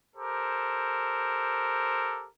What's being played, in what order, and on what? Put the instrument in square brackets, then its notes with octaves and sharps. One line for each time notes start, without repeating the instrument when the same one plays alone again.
[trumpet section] G4 A4 A#4 C5